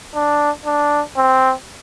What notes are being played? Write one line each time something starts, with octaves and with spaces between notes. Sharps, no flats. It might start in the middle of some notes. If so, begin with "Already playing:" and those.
D4
D4
C4